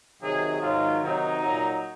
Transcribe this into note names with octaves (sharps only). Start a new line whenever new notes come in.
C3 D#3 F#3 G#4
G#2 D#3 F#3 F4
C3 D#3 F#3 D#4
A#2 F#3